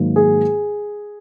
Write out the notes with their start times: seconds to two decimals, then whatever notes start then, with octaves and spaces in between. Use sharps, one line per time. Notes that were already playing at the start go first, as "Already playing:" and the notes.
Already playing: G#2 D#3 F#3 A#3
0.16 G#4